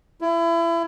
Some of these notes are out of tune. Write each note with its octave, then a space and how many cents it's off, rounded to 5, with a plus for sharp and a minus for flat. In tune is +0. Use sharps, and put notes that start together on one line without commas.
E4 +30